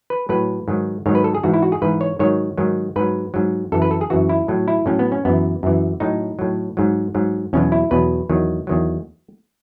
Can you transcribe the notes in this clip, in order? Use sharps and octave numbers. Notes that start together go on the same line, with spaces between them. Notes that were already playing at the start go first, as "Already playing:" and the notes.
B4
A2 F#3 B4
G#2 D#3 F#3
G#2 D#3 F#3 C#5
B4
A4
G#4
G#2 E3 F#4
E4
F#4
G#4
G#2 E3 B4
C#5
G#2 D#3 F#3 C#5
G#2 D#3 F#3
G#2 F#3 B4
G#2 F#3
F#2 E3 A4
B4
A4
G#4
F#2 E3 F#4
E4
A2 F#3
E4
A2 F#3 C#4
B3
C#4
F#2 E3 B3
F#2 E3
A2 F#3 D#4
A2 F#3
G#2 F#3
G#2 F#3
E2 B2 F#3 C#4
E4
E2 B2 F#3 B4
E2 D#3 F#3
E2 D#3 F#3